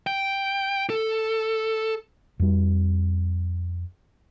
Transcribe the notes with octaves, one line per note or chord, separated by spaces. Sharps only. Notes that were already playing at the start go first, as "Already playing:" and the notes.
G5
A4
F2 G3